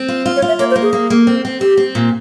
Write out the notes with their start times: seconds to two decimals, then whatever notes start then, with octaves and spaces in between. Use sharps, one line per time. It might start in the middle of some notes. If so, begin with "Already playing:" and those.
Already playing: C4
0.08 F4
0.26 F4
0.36 C#5
0.42 F4
0.48 E5
0.59 A#3 C#5
0.70 C5
0.76 A#3
0.82 G#4
0.93 A#3
1.10 A#3
1.27 C4
1.45 C4
1.61 C4 G4
1.77 C4
1.95 A#2